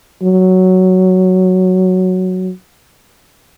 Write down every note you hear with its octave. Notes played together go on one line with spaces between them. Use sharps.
F#3